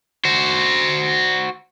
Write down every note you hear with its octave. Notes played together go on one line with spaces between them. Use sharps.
F#4 C5